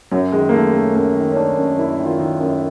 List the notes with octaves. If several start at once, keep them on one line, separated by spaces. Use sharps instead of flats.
F#2 F#3
D#3 G#3
A#3
D#3 A3
F#2 A3
F#2 A#3
D#3
C#4
D#3 D4
F#2
F#2 E4
D#3
F4
D#3
F#2